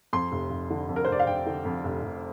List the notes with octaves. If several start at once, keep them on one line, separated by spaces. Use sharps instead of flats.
F2 C6
F1
F1
D3
F2
A#4
C5
F1 D5
F5
F1 G5
D3
F2
F1
F1